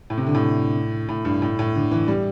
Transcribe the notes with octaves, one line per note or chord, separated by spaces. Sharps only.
A2
C3
D3
A2
A2
G2
A2
A2
D3
E3
G3